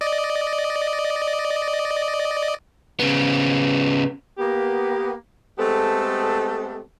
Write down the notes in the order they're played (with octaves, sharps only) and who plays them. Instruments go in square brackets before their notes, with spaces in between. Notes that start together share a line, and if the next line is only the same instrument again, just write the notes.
[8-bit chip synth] D5 D#5
[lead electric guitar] C#3 B3
[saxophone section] A#3 B3 G4
G#3 A3 B3 C4 G4 A4